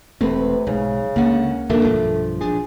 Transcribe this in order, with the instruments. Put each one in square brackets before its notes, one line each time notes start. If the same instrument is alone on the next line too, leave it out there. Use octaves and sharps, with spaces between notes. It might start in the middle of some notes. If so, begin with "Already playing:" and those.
[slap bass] E1 C4 [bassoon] C3 [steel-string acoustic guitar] A3 B4
[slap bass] B1 [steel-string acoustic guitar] G#2 [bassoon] C#3
[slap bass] C#2 D3 [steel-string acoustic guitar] A#3 C#4 F#5
[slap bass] D#2 B2 F3 [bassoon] A3 [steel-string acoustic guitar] A#3 D4
[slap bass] B1 G2 [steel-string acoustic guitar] F3
[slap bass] A#1 D4 [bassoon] G#4